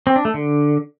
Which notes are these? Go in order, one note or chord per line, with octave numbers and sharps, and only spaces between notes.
C4
D4
A3
D3